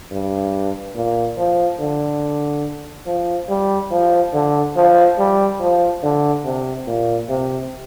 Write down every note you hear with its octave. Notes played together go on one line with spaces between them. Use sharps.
G2
A#2
F3
D3
F3
G3
F3
D3
F3
G3
F3
D3
C3
A#2
C3